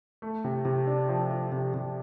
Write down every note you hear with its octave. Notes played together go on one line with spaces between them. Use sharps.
A3
C3
C3
D4
F3
F3
C3
C3